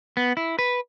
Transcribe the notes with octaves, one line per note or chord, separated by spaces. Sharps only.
B3
E4
B4